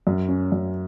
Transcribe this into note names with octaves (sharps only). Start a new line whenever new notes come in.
F#2
C#4
F#2